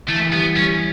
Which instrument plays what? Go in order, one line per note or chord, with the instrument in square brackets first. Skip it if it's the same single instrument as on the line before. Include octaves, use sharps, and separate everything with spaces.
[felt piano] E3 [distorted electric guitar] A3
[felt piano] G3 [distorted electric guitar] B3
[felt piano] G3 [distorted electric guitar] C#4